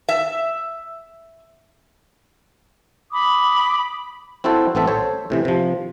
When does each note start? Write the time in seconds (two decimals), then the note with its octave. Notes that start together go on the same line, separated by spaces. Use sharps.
0.09 E5
3.12 B5 D6 D#6
4.44 C4 E4 F#4 A4 C5
4.75 A1 B3 C4 A4 E5
4.87 A4 C5 C#5
5.30 A2 C3 E3
5.45 C3 F3